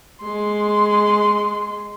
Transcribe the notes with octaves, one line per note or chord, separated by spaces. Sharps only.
G#3 C6